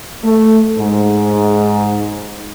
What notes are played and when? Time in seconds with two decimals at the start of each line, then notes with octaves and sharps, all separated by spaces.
0.24 A3
0.78 G#2